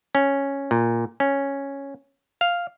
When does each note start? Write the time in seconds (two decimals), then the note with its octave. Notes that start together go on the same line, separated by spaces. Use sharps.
0.15 C#4
0.71 A#2
1.20 C#4
2.41 F5